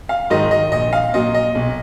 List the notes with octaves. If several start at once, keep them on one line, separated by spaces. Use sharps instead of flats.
F5
G#2 D#3 F#3 D#5
D#5
A#1 D#5
F5
A#2 F#3 D#5
D#5
B1